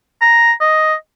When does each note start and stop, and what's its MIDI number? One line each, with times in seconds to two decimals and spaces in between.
0.22 0.52 82
0.61 0.94 75